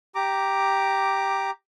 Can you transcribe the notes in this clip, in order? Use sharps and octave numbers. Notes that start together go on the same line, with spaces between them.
G4 A#5 D6